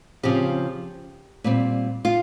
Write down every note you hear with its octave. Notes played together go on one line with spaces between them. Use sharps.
C#3 F3 C4 G4
A#2 G3 C4
F4